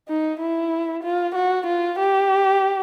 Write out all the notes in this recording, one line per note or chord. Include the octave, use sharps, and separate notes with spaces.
D#4
E4
F4
F#4
F4
G4